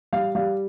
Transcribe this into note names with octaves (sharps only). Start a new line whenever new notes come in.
G3 F5
G3 F5